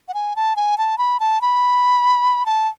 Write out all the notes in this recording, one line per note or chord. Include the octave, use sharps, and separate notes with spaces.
F#5
G#5
A5
G#5
A5
B5
A5
B5
A5